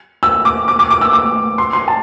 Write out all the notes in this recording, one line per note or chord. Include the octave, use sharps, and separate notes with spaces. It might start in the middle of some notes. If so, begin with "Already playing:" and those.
E6
D6
D6
D6
D6
E6
D6
C6
C6
A5